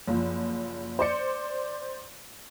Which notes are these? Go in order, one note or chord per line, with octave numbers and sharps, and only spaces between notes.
F#1 F3
C5 D5 C#7